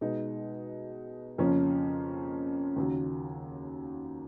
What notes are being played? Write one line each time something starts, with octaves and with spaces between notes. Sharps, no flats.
B2 G#3 D#4
F2 C#3 F3 A#3 C#4
D#2 C#3 F#3